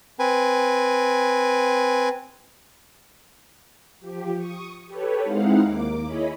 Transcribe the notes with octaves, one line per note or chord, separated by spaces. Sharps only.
C4 B4 G#5
F3 G4
C#6 D#6
G4 A4 B4 C#5
G#3 C4 D#4 E4 F5 F#5
D#2 A#3 D6
E4 G#4 C#5 D#5 B5